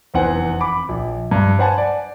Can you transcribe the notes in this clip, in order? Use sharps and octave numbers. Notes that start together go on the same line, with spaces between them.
F1 E2 C4 F#5 G#5
B5 D6
A#1
G2
B4 C5 F#5 G#5 A5
D5